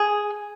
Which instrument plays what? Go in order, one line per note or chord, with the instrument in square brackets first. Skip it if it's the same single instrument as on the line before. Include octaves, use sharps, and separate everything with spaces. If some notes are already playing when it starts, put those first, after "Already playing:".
Already playing: [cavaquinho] G#4